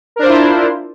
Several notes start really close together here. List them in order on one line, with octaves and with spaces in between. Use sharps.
A#4 D4 C5 F4 E4